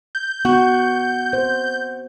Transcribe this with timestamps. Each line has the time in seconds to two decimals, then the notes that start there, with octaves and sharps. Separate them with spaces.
0.15 G6
0.45 B3 F#4
1.33 C5